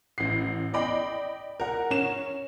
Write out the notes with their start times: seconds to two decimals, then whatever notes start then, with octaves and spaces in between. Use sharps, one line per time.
0.18 A1 C7
0.73 D5 D#5 G5 B5 D6
1.60 A#4 F#5
1.91 C#4 E7